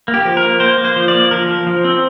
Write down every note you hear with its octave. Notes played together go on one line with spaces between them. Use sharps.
A#3
G4
F3
A#4
A#3
A#3 C5
A#3
C5
F3
D5
A#3
F3 A#4
F3
F3
C4